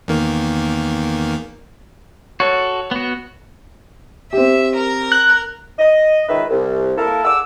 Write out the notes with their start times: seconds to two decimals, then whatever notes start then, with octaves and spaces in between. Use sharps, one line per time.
0.08 E2 D#3 A#3
2.40 F#4 A4 C#5
2.91 B3 F#4
4.33 C4 G4 E5
4.75 A#4
5.12 F#6
5.79 D#5
6.29 C#2 D#3 B4 E5
6.50 C2
6.98 A#3 E4 A4 A#4
7.25 G#4 F#5 G#5 D6 E6